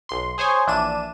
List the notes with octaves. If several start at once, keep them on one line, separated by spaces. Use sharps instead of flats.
B1 C6
G#4 C5 C#5 G#5 C6
A#1 E3 D4 D#7 E7